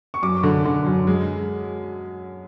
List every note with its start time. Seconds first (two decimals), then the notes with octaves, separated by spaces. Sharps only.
0.14 C#6
0.22 F#2 D6
0.43 D3
0.65 D3
0.86 F#2
1.07 G#3